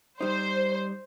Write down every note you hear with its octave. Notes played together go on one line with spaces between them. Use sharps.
G3 D#4 C5